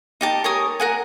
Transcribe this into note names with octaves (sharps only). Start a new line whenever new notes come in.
D#4 G4 A5
A#4 C#5 G#5 D#6
A#4 F#5 G#5